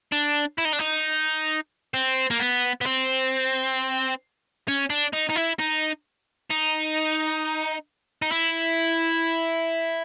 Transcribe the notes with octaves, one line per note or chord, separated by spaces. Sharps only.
D4
E4
D#4
D4
D#4
C4
A#3
B3
B3
C4
C#4
D4
D#4
D#4
E4
D#4
D#4
D#4
E4